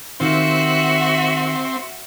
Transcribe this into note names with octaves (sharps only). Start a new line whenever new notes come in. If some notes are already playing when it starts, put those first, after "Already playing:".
D#3 C4 F4 F#4 E5